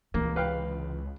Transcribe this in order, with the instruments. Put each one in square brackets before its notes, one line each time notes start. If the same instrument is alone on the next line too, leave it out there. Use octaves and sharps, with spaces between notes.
[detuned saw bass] C#2 [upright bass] C3 E3 [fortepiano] A#3
[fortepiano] B4 F5 G5